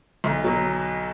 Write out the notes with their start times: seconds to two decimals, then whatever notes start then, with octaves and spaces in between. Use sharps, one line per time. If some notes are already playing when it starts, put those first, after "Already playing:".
0.24 B1
0.44 B2 F#3